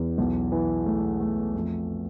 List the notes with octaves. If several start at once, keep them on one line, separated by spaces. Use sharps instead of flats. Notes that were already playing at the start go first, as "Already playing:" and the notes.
Already playing: E2
B1
E3
A3
A3
F2